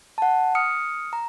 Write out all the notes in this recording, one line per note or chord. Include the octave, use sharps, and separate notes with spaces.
F#5 A5
D#6 F6 C#7
A#5